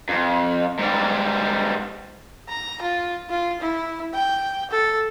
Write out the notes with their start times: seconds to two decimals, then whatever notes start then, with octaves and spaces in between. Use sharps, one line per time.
0.09 F2
0.79 G#2 G3
2.49 A#5
2.82 F4
3.30 F4
3.61 E4
4.14 G5
4.71 A4